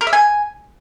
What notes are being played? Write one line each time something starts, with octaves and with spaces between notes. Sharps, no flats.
A#4
E5
G#5